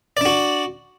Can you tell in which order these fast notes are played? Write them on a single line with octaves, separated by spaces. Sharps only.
D5 D4 F#4